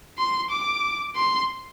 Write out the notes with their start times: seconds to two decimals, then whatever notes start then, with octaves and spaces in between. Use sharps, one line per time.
0.18 C6
0.51 D6
1.16 C6